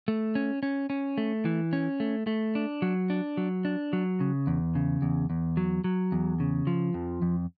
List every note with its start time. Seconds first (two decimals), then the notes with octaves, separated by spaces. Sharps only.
0.08 A3
0.35 C#4
0.63 C#4
0.90 C#4
1.18 A3
1.45 E3
1.73 C#4
2.00 A3
2.27 A3
2.55 D4
2.82 F#3
3.10 D4
3.37 F#3
3.65 D4
3.93 F#3
4.20 C#3
4.47 E2
4.75 C#3
5.02 E2
5.30 E2
5.57 F#3
5.84 F#3
6.12 E2
6.40 C#3
6.67 F3
6.94 F2
7.22 F2